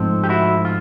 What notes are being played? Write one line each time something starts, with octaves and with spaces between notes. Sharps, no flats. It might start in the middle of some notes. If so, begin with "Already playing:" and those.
Already playing: G#2 F3 A3 C4
G4
E4 F#4
F4